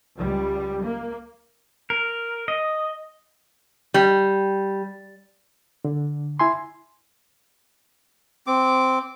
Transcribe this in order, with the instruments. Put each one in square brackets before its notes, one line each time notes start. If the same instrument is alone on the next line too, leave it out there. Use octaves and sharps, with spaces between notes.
[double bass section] C#2 G3
A#3
[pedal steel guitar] A#4
D#5
[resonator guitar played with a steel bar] G3
[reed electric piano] D3
E4 G#5 C6
[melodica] C4 D6